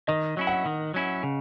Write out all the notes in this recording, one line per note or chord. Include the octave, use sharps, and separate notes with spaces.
D#3 D#5
F#3 C#4 E4
F#5
D#3
F#3 C#4 E4
C#3